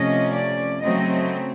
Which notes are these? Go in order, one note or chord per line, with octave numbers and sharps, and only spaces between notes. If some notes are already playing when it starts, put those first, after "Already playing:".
Already playing: C3 F3 A3 C#4 D#5
D5
C#3 F#3 A3 C4 D#5